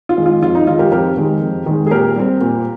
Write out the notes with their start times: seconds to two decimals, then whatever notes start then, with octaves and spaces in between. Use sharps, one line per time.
0.09 F4
0.17 D#3 G#3
0.26 F4
0.42 F2 F4
0.55 D#4
0.67 D#3 G#3 F4
0.79 G4 A#4
0.92 F2 G4 A#4
1.17 D#3 G#3
1.42 F2
1.66 D#3 G#3
1.86 G#4
1.91 A#2 G4 A#4
2.16 G3 C4
2.41 A#2